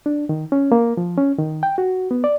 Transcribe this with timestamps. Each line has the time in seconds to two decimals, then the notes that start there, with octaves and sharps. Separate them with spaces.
0.06 D4
0.29 D#3
0.52 C#4
0.72 A#3
0.97 F3
1.17 C#4
1.39 D#3
1.63 G5
1.78 F#4
2.11 B3
2.24 D5